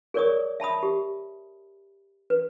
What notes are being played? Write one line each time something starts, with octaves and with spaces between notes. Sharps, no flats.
G#4 A#4 C#5 D5 C#6 D#6
E5 A5 B5 D#6
G4
B4